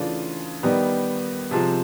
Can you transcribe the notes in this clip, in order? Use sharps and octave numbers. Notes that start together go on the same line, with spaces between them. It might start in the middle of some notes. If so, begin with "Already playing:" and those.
Already playing: C#3 E3 A3 D4 F4
D#3 G3 B3
C3 F3 G#3 C4